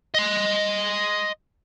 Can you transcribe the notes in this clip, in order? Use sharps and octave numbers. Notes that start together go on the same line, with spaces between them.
D#5 C6